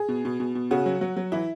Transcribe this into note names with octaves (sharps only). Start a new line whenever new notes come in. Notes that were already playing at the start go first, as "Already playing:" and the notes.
Already playing: G#4
B2
B2
B2
B2
C#3 F#4
F#3
F#3
F#3
E3 E4